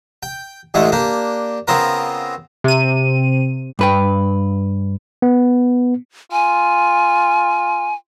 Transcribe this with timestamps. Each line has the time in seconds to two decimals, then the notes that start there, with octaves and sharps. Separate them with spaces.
0.23 G5
0.74 A1 A2 D3 G#3 A3
0.92 A#3 D4 G4
1.68 C#3 B3 C4 F4 A#4
2.64 C3 D#7
3.79 G2 B4 G5
5.22 B3
6.32 F4 G#5